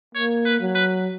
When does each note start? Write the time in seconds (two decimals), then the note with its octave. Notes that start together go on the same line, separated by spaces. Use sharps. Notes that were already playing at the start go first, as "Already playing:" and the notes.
0.15 A#3 C#5
0.46 B4
0.61 F#3
0.75 B4